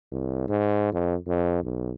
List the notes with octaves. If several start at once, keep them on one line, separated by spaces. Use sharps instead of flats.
C2
G#2
F2
F2
B1